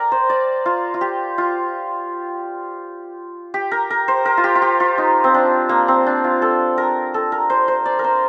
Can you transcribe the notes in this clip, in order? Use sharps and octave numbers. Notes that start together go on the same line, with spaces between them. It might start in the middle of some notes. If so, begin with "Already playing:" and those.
Already playing: A#4 D5 G5
C5
D5
F4
F4
G4
F4
G4
A#4
A#4
C5
A#4
F4
G4
F4
G4
F4
D#4
C4
D4
A#3
C4
D4
F4
A4
A#4
A4
A#4
C5
C5
D5
A#4
C5